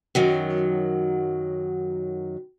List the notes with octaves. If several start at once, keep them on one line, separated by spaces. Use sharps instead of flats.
F#2 D#3 F#3